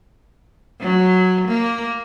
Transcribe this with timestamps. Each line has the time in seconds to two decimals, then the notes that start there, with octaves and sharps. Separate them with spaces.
0.80 F#3
1.47 A#3